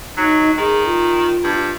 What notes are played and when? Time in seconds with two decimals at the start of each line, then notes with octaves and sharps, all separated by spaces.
0.17 F#3 D#4
0.58 D#3 G#4
0.85 F4
1.44 G2